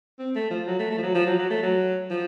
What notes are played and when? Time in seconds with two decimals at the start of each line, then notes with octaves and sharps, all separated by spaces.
0.19 C4
0.35 A3
0.50 F3
0.67 F#3
0.79 A3
0.91 A3
0.98 F3
1.03 F#3
1.15 F3
1.26 F#3
1.39 F#3
1.50 A3
1.63 F#3
2.10 F3